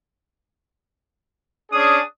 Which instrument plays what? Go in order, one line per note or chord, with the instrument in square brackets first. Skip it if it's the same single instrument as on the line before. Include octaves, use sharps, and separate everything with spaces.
[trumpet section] C#4 D4 G#4 [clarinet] D#6